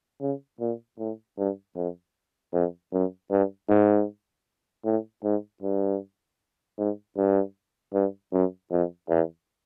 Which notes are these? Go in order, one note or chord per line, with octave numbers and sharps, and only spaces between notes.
C#3
A#2
A2
G2
F2
F2
F#2
G2
G#2
A2
G#2
G2
G#2
G2
G2
F#2
F2
E2